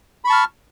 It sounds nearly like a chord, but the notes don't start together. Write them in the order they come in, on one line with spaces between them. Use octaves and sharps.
B5 C#6 A5 F6